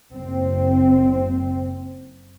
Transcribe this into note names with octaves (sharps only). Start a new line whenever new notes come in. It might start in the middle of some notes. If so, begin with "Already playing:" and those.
F#1 C4